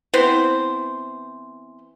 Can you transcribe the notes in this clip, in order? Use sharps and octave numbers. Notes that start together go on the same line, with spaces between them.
E3 B3 C4 C5